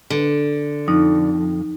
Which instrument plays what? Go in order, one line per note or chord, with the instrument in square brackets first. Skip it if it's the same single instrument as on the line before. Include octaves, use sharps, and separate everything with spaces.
[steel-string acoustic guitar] D3
[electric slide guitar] F2 [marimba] D#4